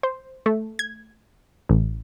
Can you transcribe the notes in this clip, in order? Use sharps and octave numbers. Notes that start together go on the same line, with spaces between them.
C5
A3
G#6
A1